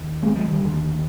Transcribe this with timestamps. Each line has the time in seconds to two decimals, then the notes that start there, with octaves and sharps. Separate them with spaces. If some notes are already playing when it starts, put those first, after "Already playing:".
Already playing: D#2
0.23 G#3 C4
0.35 F3 G#3
0.48 D#3 G3
0.61 D#2 D3